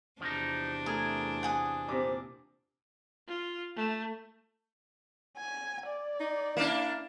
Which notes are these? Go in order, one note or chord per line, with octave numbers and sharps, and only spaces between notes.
E2 C3 F3 D4 D#4
A3 G#4 A#4
F#5 G#5 D#6
A#2 C4 G4 D6
F4
A3
G#5
D5
D#4
A#3 D4 E4